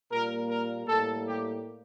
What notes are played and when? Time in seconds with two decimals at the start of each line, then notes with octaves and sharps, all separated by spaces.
0.12 A#2 G3 A#3 A#4
0.50 A#4
0.88 A2 G3 A#3 A4
1.27 G4